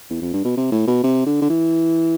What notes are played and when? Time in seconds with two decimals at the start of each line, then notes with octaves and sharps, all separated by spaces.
0.10 E2
0.22 F2
0.33 G2
0.44 B2
0.57 C3
0.72 A2
0.87 B2
1.03 C3
1.26 D3
1.41 D3
1.50 E3